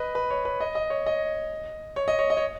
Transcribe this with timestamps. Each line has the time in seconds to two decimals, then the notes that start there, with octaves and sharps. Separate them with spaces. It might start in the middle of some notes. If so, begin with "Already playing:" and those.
Already playing: B4 D#5
0.15 B4
0.30 C#5
0.45 B4
0.60 D#5
0.75 D#5
0.90 C#5
1.06 D#5
1.96 C#5
2.08 D#5
2.19 C#5
2.30 D#5
2.37 C#5